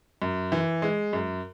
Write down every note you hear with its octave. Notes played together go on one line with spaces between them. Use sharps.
F#2
E3
G#3
F#2